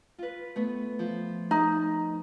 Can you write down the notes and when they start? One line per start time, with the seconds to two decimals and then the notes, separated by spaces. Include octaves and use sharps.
0.19 F4 B4
0.56 A3 B3
0.99 F3
1.51 D#4